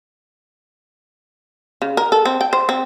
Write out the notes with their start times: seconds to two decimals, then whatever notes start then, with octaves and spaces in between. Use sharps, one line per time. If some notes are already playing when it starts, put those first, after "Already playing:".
1.82 C#3
1.97 A#4
2.12 A4
2.25 C4
2.41 G5
2.53 C5
2.69 C4